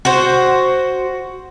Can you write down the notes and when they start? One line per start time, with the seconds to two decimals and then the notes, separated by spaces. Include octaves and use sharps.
0.05 F#4 C5